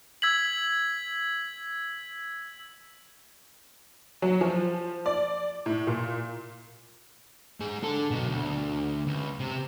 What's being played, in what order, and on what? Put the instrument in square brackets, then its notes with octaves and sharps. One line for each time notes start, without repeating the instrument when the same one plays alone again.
[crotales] E6 G#6 B6 F#7
[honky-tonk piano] F#3
F3
D5
A2
A#2
[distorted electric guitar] G#2 G#4
D4 A4
B2 F#3
D2
C#2
C3